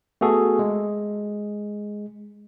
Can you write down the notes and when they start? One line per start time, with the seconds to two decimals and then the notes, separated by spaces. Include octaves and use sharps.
0.21 A3 B3 F#4 G#4 A4
0.59 G#3